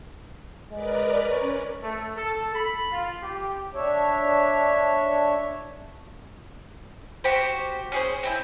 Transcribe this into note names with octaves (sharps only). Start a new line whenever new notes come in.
G#3 A#4 B4 D5
C#4 C#5
A3
A4
B5
F4
G4
D4 C#5 E5
F#4 G4 C5
C#4 G#4 C5
C4 E4 G#5